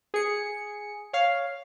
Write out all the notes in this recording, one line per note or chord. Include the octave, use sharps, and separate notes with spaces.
G#4 C#7
C#5 F5